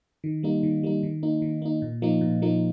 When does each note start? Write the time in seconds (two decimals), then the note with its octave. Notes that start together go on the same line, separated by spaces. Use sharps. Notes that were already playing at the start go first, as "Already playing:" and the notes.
0.24 D#3
0.43 G3 A#3 D#4
0.63 D#3
0.83 G3 A#3 D#4
1.03 D#3
1.23 A#3 D#4
1.42 D#3
1.62 A#3 D#4
1.82 A#2
2.02 F3 A#3 D#4
2.21 A#2
2.42 F3 A#3 D#4